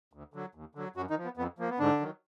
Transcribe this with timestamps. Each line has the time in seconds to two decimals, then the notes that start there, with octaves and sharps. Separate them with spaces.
0.13 D2
0.34 D3 F#3
0.55 D#2
0.75 D3 F#3
0.96 F#2 F#3 F#4
1.10 D#3 D#4
1.18 F3
1.24 B3
1.37 F2 B3
1.59 F3 A#3
1.69 B3
1.79 G#2 D3 D4
2.00 D#3 F#3